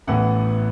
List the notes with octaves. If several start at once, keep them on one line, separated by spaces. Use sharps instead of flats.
A1 A2 E3 B3 F#5